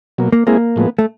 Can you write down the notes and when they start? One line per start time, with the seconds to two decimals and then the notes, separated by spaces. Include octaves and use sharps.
0.18 B2 F#3 A#3
0.33 A#3
0.47 G#3 A#3 C4 E4 G#4
0.76 A2 F3 G#3 B3
0.99 A3